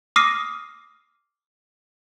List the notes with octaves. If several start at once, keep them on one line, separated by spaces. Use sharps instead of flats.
D6 D#6 F6 A#6 C7 D#7